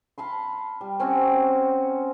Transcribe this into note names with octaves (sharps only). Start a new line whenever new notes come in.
F5 A5 B5 C6
G3
C4 C#4 F#4 C#5